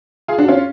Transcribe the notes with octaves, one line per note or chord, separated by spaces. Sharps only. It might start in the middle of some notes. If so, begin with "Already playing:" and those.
F4 G#4
D4 F#4
C#4 F4